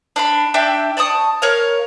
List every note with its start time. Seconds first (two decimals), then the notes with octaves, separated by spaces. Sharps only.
0.16 D4 F5 B5
0.54 D4 E5 G5 D6
0.97 D5 A5 C#6 D#6
1.42 A#4 C#5 F5